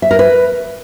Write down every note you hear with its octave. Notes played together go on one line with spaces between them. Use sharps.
E5
A#4
B4